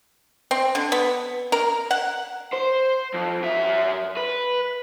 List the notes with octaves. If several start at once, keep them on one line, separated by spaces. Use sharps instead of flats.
C4
D3
B3
A#4
F#5
C5
F2
F#2 E5
B4